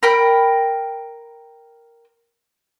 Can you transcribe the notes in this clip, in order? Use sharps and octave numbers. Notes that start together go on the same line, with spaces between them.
A#4 G5 B5